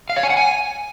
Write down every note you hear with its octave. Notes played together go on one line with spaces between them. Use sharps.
F5
C#5
G#5
F#5
G#5